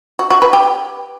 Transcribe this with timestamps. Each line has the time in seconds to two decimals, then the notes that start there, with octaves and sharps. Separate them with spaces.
0.19 F#4
0.30 F#4
0.42 B4
0.53 G4